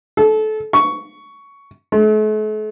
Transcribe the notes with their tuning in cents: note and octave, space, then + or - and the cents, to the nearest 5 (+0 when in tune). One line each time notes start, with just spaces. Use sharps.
A4 -25
C#6 +10
A3 -45